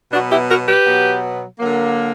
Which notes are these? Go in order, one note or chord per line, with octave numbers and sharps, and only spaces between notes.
B2 F#3 B3 D4 F#4
E4 G4
F#4 A#4
G4 B4
B2 F#3 B3
D3 F#3 A#3